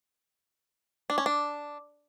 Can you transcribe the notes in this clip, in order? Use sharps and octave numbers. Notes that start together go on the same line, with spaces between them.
D4
C#4
D4